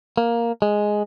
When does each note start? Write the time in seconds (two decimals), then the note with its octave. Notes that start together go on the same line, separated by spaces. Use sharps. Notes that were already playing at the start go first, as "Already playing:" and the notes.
0.18 A#3
0.62 G#3